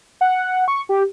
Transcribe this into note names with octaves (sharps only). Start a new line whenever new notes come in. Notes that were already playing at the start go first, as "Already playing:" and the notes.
F#5
C#6
G4